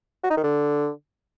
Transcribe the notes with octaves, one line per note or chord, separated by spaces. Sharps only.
F#4
D#4
D#3
D3